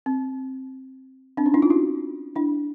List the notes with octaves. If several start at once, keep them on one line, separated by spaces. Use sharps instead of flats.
C4
C4 D4
C#4 D#4
D4 E4
D#4 F4
E4 F#4
D4 E4